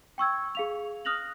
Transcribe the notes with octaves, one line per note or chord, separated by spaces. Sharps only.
G5 C#6 E6 G#6
G#4 F5 F7
D#6 F6 F#6 A#6 F7 F#7